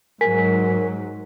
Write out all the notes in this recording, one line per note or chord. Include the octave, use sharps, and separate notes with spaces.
G#2 F#3 A#4 G#5 B6